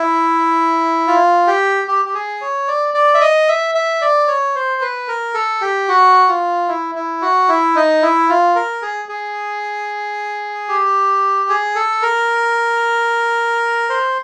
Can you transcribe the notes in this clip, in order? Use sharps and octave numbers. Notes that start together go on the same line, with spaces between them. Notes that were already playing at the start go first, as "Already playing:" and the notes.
Already playing: E4
F4
G4
G4
G4
G#4
C#5
D5
D5
E5
D#5
E5
E5
D5
C#5
C5
B4
A#4
A4
G4
F#4
F4
E4
E4
F#4
E4
D#4
E4
F4
A#4
G#4
G#4
G4
G#4
A4
A#4
C5